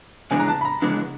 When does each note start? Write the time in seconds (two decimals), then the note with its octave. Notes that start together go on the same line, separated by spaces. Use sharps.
0.31 C#3 E3 G#3 B3 D4 G#5
0.40 A#5
0.48 A5
0.61 B5
0.65 A#5
0.82 C#3 E3 G#3 B3 D4